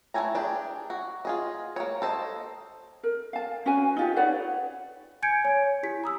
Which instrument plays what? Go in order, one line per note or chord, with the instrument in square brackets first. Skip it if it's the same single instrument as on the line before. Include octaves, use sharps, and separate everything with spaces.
[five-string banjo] E3 F3 A3 G#5 A#5
D4 G4 G#4
F#4
F4 G#4 D#5
A#3 C#5
A4 C5 D#5
[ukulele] A#4
F5 A5
C#4 F#4 B4 G#5
D#4 F4 G4
B4 C#5 D5 F#5
[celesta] G#5 G6 G#6 C#7 D7
C#5 G#5
E4 G4 B6
A#5 D#6 E6